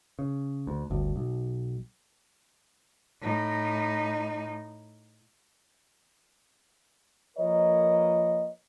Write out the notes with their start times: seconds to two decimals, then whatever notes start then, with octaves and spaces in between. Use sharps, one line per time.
0.19 C#3
0.67 D2
0.90 D1 G1 D2
1.16 B1
3.21 A2 D#4
7.38 F3 A#3 A#4 B4 C#5 D#5